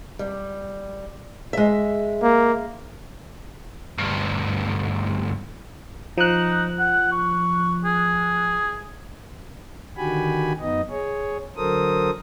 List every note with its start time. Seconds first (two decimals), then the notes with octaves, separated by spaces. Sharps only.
0.19 G3
1.53 G#3 E5
2.22 A#3
3.98 D2 G2
6.18 F3 D#4 F#6
6.79 F#5
7.12 C#6
7.85 G#4
9.97 D3 D#3 F#4 G4 G#5 B5
10.60 F#2 B3 D#4 D#5
10.90 G#4 C#5
11.57 D3 F#3 A4 A#4 C5 D#6